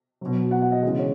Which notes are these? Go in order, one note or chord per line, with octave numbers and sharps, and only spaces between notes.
B2 F#3
F#5
F#5
D#5
C#3 E3 G#3 D#5
C#5